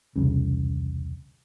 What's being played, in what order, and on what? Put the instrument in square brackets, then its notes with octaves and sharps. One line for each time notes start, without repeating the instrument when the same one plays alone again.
[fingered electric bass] E1 C2 C#3